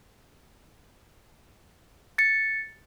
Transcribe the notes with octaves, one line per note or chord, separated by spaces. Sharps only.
A6 C#7